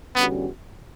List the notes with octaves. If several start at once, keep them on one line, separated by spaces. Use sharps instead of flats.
E2 D3 G3 B3 C#4 F#4